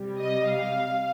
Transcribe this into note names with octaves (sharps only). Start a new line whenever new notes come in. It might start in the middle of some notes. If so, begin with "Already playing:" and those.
Already playing: C3 G3
D#5
F5